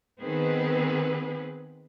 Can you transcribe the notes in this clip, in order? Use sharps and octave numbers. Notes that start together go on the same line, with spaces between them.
D#3 B3 C4 G#4 B4